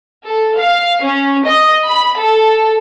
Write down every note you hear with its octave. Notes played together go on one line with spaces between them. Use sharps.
A4
F5
C#4
D#5
B5
A4